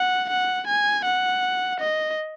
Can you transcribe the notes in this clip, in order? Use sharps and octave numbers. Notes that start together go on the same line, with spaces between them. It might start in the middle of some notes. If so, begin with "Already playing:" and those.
Already playing: F#5
F#5
G#5
F#5
D#5